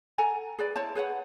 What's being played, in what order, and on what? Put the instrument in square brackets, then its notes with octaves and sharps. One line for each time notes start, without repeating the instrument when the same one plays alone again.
[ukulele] A4 F#5 G#5 A#5
G#4 B4 D5
E4 C5 C#5 A5
G#4 B4 C#5 F#5